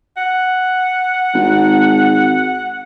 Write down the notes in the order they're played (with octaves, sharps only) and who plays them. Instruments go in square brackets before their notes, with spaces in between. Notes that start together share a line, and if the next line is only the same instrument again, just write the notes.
[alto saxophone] F#5
[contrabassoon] G#1